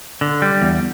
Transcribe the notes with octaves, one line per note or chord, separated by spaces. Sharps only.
D3
G3
E2